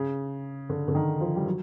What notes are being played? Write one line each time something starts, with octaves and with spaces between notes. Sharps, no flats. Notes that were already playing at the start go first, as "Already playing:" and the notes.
Already playing: C#3
D3
D3
D#3
F3
G3
F#3